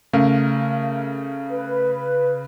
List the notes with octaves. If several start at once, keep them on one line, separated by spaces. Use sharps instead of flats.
C#3 A3 A#4 F5
B4